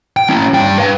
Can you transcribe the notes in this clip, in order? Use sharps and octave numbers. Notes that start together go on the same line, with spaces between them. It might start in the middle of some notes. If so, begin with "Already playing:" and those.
G5
C#4 E4
G2 G5
B4 F5